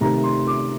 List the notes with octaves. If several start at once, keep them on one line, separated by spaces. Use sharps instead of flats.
C3 D#3 A3 A#5
C6
D6